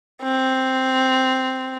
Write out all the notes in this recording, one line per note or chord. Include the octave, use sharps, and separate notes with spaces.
C4